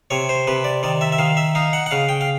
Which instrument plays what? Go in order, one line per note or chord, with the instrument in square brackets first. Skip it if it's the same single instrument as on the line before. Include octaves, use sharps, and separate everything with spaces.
[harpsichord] C3 C#5
C5
C3 B4
D5
D#3 D5
E5
E5
D#3 F5
E5
D#4 F5
F#5
F#5
C#3 F5
G5
F5